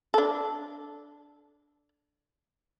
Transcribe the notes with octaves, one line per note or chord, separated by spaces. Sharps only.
D4 A4